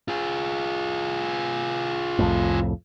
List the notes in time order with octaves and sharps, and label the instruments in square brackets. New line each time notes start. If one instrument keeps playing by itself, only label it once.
[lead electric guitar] F4 G#4
[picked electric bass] C2 F2 A2